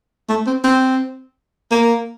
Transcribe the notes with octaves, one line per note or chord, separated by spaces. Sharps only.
A3
C4
C4
A#3